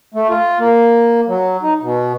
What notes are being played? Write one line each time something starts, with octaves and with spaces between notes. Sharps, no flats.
A3
F4
A#3
F#3
D#4
B2